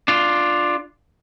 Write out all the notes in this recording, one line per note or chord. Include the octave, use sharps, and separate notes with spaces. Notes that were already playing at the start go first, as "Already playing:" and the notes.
D4 F4